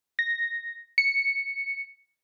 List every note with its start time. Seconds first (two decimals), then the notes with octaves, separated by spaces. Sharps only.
0.19 A#6
0.98 C#7